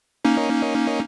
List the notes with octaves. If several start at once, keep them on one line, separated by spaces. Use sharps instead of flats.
A#3 C#4 D#4